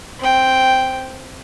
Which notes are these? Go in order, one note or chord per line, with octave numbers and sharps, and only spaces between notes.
C4 G5